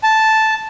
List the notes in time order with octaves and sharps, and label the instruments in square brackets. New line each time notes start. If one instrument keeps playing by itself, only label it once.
[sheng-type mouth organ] A5